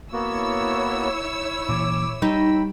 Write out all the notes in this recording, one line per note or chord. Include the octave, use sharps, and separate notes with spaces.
A#3 B3 E4 F#4 C#5 E6
A#2 E3 D6
G3 D#4 G5 B5